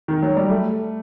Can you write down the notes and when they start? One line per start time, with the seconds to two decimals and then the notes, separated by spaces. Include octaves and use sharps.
0.08 D#3
0.22 F#3
0.36 G3
0.50 A3